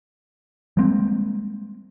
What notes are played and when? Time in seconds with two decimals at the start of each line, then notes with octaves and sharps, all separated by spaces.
0.77 G3 G#3 A#3 C4